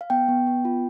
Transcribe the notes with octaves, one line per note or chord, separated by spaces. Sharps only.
F5
B3 G5
B3
B3
F4